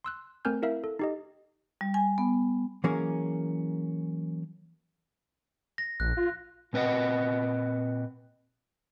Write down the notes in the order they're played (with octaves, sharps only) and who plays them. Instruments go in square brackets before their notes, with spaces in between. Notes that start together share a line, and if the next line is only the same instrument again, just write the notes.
[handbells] C6 E6 F#6
A3 C4 A#4 G#5 F6 G6
E4 A#4 E5 F5
A4
D#4 G4 D#5
[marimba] G3
G#5
B3
[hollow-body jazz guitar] E3 F#3 A#3 C#4 G#4 A#4
[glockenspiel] A#6
[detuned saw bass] A#1 [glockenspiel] F#6
[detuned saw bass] F4
[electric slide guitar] A#2 C4 B4 D#5 F#5